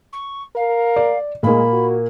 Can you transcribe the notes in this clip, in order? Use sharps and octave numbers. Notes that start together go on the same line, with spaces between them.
C#6
A#4 F5
D5
A#2 G#3 A#3 B5
F#4